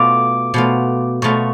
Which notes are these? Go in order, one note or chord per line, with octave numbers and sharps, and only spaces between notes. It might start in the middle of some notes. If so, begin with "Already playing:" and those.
Already playing: B2 A3 F4 D6
B2 A3 F4
B2 A3 F4 C#6